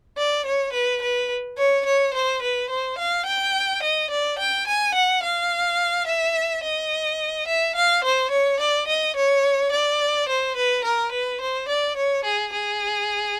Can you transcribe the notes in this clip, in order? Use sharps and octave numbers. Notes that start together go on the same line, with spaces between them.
D5
C#5
B4
B4
C#5
C#5
C5
B4
C5
F5
G5
D#5
D5
G5
G#5
F#5
F5
E5
D#5
E5
F5
C5
C#5
D5
D#5
C#5
D5
C5
B4
A#4
B4
C5
D5
C#5
G#4
G#4